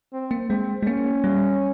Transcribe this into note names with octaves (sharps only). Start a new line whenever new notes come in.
C4
A#3
G#3 C4
G#3
A#3 C#4
G3